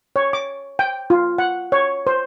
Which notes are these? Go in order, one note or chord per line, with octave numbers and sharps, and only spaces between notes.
C#5
D6
G5
F4
F#5
C#5
C5